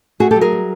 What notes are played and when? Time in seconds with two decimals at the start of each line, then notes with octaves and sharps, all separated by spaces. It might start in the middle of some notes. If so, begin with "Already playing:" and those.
0.20 A3 F#4 G#4
0.31 G4 A4
0.36 F#3
0.41 G#4 A#4
0.52 G3